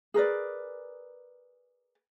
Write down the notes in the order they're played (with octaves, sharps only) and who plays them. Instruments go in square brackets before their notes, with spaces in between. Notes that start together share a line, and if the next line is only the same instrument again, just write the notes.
[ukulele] G#4 A#4 B4 D5